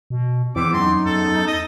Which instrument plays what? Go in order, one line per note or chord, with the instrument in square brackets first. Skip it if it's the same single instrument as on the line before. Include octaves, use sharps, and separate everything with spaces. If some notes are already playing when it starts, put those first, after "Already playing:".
[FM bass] B2
[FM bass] E2 [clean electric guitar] E3 [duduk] C4 [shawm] D6
[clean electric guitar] F#2 [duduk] D#4 [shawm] C6
[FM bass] E2 [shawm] A4
[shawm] D#5